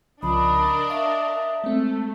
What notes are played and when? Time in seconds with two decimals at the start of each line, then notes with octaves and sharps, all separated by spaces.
0.23 C2 C#3 F3 D4 A#4 D#5 B5
0.90 E5 F5 C#6 D#6
1.64 G#3 A3 C4